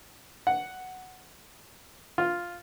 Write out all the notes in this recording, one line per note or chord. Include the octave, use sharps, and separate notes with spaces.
F#5
F4